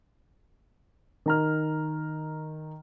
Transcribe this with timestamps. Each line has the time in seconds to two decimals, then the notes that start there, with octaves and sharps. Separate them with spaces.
1.26 D#3 A#5 F6